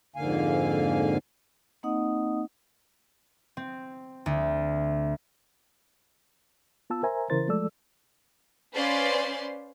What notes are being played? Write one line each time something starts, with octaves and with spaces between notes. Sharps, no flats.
F2 G#2 D3 A#3 F5 G#5
A#3 C4 D#4 D#5 F#5 D#6
C4
D2
B3 F4 A5 E6
A#4 C5 E5 G#5 A#5
C#3 E3 E4 A#4 C5 A6
F3 G#3 A3 A4 D5 E6
C#4 B4 C5 D5 F5 C6